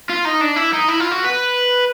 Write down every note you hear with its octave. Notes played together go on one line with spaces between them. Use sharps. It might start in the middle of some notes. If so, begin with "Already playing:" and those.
F4
D#4
D4
E4
D#4
E4
F4
F#4
B4